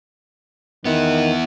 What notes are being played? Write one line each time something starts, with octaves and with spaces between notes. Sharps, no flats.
D#3 B3 E4